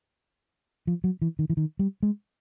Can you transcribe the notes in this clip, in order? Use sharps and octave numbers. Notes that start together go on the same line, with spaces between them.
F3
F#3
E3
D#3
E3
D#3
G3
G#3